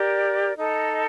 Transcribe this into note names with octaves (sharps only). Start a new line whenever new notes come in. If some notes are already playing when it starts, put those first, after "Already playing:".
Already playing: G4 A#4 D5
D#4 A4 D#5